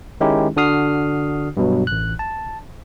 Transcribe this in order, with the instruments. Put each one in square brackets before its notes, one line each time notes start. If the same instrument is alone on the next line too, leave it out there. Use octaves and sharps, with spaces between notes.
[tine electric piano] D#3 G#3 C#4 D#4 E4 G4
D3 D4 F#4 D#6 F6 C7
G2 B2 F#3
A1 F#6
A5